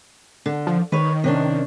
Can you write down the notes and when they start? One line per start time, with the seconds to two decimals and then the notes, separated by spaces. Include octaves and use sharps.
0.46 D3
0.67 F3
0.92 D#3 B4 C#5
1.24 C3 C#4 D4